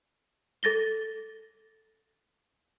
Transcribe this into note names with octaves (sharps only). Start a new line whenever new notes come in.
A4 A6 A#6 G7